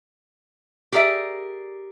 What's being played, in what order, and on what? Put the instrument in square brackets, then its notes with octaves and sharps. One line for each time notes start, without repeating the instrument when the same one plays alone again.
[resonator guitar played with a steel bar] G4 G#4 A#4 D5 E5